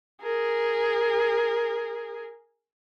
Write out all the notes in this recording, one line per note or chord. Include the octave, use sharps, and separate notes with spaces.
G#4 A#4